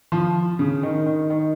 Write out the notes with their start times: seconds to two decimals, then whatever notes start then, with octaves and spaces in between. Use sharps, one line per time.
0.12 F3
0.59 C#3
0.83 D#3
1.06 D#3
1.30 D#3